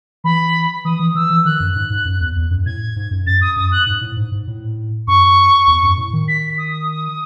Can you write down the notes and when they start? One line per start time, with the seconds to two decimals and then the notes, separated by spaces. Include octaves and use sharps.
0.24 E3 B5
0.85 E3 D#6
1.00 E3
1.15 E3 E6
1.30 E3
1.45 D#3 F#6
1.60 F#2
1.75 G#2
1.90 G#2
2.05 F#2
2.20 E2
2.36 E2
2.50 F#2
2.66 A2 G#6
2.96 G#2
3.11 F#2
3.26 F#2 A6
3.41 D#6
3.56 F#2 D#6
3.71 F#6
3.86 G#2
4.01 A2
4.17 G#2
4.32 G#2
4.47 A2
5.07 F#2 C#6
5.67 E2
5.83 F#2
5.98 A2
6.13 D#3
6.28 B6
6.58 D#6